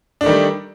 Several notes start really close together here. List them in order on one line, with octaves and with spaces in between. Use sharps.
D4 A3 D#3 G3